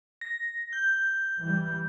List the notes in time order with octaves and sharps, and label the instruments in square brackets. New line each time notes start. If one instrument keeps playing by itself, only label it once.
[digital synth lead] A#6
G6
[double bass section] E3 G3